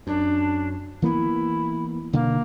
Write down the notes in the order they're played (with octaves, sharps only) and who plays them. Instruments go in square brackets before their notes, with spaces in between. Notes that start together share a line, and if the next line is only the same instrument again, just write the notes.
[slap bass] F#2 [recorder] D4
[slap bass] E3 A#3 B3 [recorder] E4
[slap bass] B2 D3 [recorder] A#3